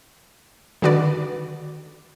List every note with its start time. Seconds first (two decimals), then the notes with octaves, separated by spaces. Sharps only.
0.82 D3 D#3 F#4 B4 D5